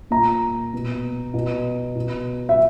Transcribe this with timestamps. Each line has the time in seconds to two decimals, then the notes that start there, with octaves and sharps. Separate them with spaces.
0.11 A#2 A#5
0.73 B2
1.34 B2
1.96 B2
2.49 E5